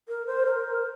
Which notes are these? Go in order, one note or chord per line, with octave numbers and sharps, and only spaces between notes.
A#4
C5
A#4